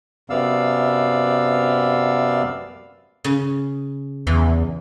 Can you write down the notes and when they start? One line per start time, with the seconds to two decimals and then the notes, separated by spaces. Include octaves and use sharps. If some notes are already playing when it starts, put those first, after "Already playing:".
0.30 F#2 C3 B3 D5 F5 E6
3.24 C#3
4.27 E2 E3